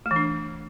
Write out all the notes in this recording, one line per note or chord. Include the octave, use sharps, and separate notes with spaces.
A3
E3
D4